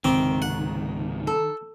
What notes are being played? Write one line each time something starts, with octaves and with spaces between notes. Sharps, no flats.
C#2 G#2 C3 D#3 C4 D6
F#5
A4